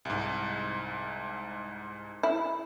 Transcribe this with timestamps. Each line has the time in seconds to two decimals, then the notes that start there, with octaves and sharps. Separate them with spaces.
0.05 C2 G#2
2.23 E4